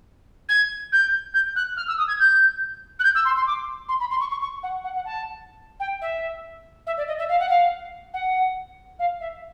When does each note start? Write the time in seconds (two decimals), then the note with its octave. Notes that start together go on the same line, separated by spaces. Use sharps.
0.49 G#6
0.92 G6
1.34 G6
1.56 F#6
1.77 F6
1.88 E6
1.98 D#6
2.08 G#6
2.19 G6
2.99 F#6
3.04 G6
3.15 E6
3.25 C6
3.36 C6
3.47 D6
3.89 C6
4.00 B5
4.11 C6
4.20 C#6
4.31 C#6
4.42 C#6
4.63 F#5
4.84 F#5
4.95 F#5
5.05 A5
5.80 G5
6.02 E5
6.87 E5
6.97 D5
7.08 D#5
7.19 E5
7.29 F5
7.40 F#5
7.49 F5
8.14 F#5
8.99 F5
9.21 E5